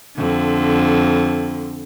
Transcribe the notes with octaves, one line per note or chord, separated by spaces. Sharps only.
F2 D3